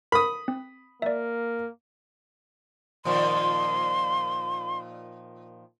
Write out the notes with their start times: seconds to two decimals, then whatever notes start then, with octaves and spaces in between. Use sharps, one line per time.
0.12 A#4 B5 D#6
0.48 C4
1.02 A#3 D5 E5
3.05 A#2 D#3 F3 C6